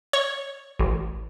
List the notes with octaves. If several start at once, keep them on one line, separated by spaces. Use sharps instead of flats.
C#5
A1